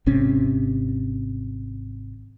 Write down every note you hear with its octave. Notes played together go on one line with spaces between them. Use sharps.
G#1 C3 C#4